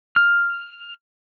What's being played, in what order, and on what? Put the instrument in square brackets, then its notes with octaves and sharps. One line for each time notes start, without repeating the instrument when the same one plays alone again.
[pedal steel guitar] F6